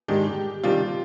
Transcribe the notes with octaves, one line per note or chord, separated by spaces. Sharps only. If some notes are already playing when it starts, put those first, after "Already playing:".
G#2 D#3 G#3 D4 G4
C3 D#3 G3 D4 F4